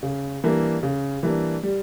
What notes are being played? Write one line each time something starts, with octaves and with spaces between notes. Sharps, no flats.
C#3
E3 G3 A#3 D4
C#3
E3 G3 A#3 D4
G3